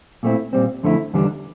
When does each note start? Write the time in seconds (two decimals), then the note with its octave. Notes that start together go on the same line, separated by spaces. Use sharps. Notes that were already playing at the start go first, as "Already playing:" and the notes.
0.23 A#2 A3 C4 E4
0.53 A#2 G3 C4
0.83 F2 D3 A3 E4
1.14 E2 D3 G3 D4